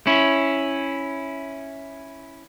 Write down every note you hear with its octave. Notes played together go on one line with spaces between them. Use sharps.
C#4 E4